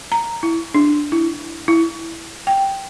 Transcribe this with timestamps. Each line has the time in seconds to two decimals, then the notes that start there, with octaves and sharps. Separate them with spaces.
0.12 A#5
0.43 E4
0.74 D4
1.12 E4
1.68 E4
2.47 G5